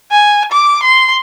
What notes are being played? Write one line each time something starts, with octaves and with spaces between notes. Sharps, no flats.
G#5
D6
C6